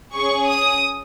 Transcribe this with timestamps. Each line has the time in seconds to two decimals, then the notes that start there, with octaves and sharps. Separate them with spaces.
0.14 C#4 G#4 C#6
0.48 D#6